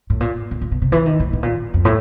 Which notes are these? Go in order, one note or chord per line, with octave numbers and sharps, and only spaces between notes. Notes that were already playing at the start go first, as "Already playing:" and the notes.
A2
A#2
A#2
A#2
B2
C3
E3
D#3
A2
A2
A#2
F2
A2